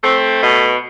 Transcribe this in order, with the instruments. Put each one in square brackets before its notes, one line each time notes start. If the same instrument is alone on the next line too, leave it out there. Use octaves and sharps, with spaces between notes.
[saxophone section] A3 C4
B2